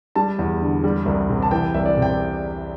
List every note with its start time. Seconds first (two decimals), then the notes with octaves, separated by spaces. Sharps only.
0.16 G3 A5
0.39 E2
0.62 D3
0.84 G3
1.06 C2
1.30 C3
1.42 A5
1.51 E3 G5
1.74 C2 E5
1.86 D5
1.97 C3
2.02 G5